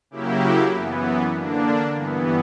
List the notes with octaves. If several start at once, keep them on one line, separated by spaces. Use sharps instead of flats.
C#3 F#3 A#3 E4 G4
F#2 E3 B3
D3 A#3 D4
G2 E3 B3